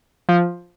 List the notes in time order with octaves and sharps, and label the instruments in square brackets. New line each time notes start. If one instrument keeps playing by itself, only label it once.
[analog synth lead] F3